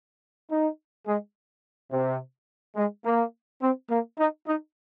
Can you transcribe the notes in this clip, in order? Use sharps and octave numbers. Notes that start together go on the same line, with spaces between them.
D#4
G#3
C3
G#3
A#3
C4
A#3
D#4
D#4